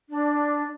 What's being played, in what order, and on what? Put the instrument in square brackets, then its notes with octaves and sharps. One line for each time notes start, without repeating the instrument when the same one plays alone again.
[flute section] D4